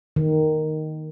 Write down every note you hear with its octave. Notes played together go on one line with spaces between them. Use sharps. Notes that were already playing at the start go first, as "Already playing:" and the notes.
D#3